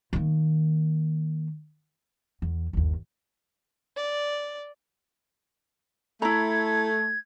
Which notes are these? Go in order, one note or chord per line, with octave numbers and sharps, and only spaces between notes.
D#3 A#3
E2
G1 D#2
D5
A3 E4 A#5 G#6